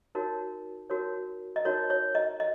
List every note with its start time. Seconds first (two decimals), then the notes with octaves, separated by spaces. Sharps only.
0.15 D#4 F#4 A#4 C#5
0.90 D#4 F#4 A#4 C#5
1.56 D#5
1.65 D#4 F#4 A#4 C#5
1.90 C#5
2.15 D#5
2.40 D#5